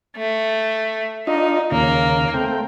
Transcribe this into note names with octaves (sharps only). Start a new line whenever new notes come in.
A3
D4 D#4 F4 D#5
D#2 C#3 A#3
A3 C4 G5